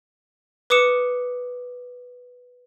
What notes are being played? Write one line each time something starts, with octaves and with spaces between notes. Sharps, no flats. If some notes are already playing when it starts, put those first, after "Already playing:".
B4 D6 D#6 C#7 E7